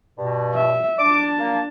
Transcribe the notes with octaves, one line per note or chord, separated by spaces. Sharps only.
G2 B2
E5
D4 A5 D6
A#3